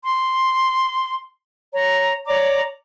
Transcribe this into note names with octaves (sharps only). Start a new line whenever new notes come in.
C6
C#5 A#5
C#5 D5 A#5 D6